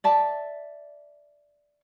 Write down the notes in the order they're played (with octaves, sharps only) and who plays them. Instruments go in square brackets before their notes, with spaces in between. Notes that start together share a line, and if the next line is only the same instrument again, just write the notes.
[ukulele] D5 E5 A5